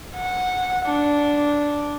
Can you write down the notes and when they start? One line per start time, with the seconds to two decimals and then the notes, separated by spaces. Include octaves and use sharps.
0.16 F#5
0.86 D4